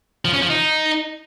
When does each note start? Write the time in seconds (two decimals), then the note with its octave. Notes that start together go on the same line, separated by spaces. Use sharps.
0.25 F3
0.33 C#4
0.42 F3
0.50 D#4